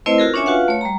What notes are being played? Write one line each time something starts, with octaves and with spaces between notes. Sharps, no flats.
A3 C4 E4 B4 C5 D#5
F4 F#4 G#4 A#4
C#4 D4 C#5 E5 G#5
F4 F#4 B4 F5 F#5
A3 C#5
G3 A#5